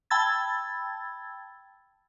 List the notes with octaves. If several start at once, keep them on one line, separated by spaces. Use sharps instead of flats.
G5 A5 B5 E6 G#6 A6